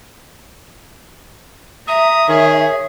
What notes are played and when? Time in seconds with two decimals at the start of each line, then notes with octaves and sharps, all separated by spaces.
1.88 E5 A#5 D#6
2.29 D#3 G#4 C#5